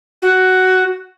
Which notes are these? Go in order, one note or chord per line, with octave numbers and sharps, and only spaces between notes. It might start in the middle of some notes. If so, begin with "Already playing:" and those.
F#4